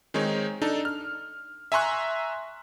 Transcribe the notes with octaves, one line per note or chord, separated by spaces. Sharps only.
D#3 G#3 C4 D#4 C#5
D4 D#4 A4
F6
E5 G#5 A#5 C6 C#6 F#6